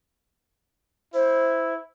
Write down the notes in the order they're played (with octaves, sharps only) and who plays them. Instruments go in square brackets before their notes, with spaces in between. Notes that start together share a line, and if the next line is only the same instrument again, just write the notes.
[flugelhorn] E4 [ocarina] C5